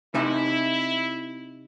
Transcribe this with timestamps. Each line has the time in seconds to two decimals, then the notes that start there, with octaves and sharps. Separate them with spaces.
0.14 C3 D#4 E4 E5